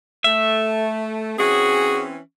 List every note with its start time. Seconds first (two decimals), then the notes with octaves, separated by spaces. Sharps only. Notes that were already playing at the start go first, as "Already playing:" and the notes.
0.24 A3 E5
1.38 E3 C4 C#4 F#4 G#4